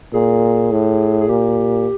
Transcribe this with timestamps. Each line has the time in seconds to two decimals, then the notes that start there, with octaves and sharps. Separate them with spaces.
0.13 A#2 G#4
0.72 A2
1.21 G#4
1.28 A#2 G4